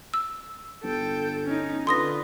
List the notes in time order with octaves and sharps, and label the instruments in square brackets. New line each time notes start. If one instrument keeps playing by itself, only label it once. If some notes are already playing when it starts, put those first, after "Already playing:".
[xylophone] E6
[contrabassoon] G1 [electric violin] A4 G5
[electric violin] C#4 D#4
[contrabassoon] D3 [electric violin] F4 B4 [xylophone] C6 D#6 A#6